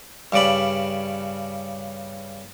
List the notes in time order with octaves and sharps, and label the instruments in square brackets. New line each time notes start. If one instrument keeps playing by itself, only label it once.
[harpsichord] G2 C#3 D5 B5